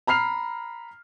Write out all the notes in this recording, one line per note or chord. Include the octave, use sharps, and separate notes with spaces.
A#5 B5 F6 C7 F7